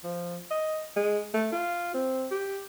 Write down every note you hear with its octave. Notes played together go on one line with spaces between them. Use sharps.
F3
D#5
G#3
A3
F4
C4
G4